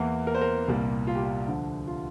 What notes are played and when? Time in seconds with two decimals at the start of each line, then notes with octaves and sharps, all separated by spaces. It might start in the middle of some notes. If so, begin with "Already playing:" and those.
Already playing: E2 E3 A#3
0.27 A#4
0.35 C5
0.41 A#4
0.68 C2 A#2 G3 A#3
1.07 F4
1.15 G4
1.23 F4
1.48 D2 D3 F3
1.87 F4